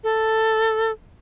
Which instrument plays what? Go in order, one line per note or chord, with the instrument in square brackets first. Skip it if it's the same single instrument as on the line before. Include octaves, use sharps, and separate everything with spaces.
[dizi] A4